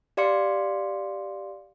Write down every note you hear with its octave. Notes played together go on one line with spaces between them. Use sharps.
G4 D5 F5 C6 C#7